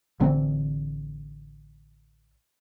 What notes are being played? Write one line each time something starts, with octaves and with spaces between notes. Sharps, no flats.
A1 D3 E3 C4